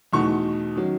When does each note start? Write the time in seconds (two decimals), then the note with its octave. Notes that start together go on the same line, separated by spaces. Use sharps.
0.13 E2 B2 A3 D#4 C#6
0.76 D#3 F#3 C#4